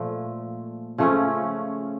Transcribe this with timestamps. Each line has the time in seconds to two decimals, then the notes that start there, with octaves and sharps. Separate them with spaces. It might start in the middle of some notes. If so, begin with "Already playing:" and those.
Already playing: A#2 F3 A3
0.98 C#3 F3 A3 C#4